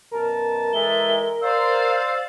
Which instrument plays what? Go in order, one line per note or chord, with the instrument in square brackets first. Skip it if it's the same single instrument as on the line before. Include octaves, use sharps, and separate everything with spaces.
[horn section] F#2 B2 A5 [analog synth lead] A#4
[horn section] E3 G#3 [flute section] A4 E5 [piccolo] G7
[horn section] C5 [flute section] D5 F5 [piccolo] E6